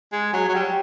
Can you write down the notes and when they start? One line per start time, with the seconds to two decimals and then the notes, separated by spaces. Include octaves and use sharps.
0.12 G#3
0.33 F#3
0.48 F#3
0.55 G3